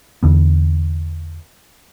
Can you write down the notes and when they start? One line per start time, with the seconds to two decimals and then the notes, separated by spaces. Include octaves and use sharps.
0.23 E2 D3 B3